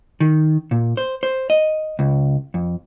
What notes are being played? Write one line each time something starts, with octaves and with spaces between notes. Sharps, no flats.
D#3
A#2
C5
C5
D#5
C#2
F2